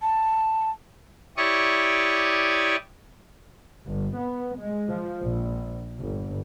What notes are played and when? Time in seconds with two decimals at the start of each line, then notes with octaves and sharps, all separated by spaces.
0.02 A5
1.37 E4 G4 C#5 D5 C#6 D#6
3.86 G1
4.18 B3
4.58 G#3
4.89 F3
5.23 A#1
5.98 G1